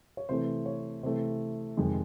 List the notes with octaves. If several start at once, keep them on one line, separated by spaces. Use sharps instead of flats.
C#5
C3 E3 A3 C5
C#5
C3 E3 A3 C5
F2 C3 D#3 G#3